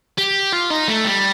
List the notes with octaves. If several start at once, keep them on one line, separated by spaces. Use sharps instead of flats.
G4
F4
D#4
A3
G3